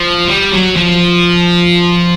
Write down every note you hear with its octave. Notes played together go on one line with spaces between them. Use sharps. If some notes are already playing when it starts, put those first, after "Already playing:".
Already playing: F3
G3
F#3
F3